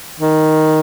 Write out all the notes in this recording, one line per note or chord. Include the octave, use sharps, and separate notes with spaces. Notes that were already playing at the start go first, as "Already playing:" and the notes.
D#3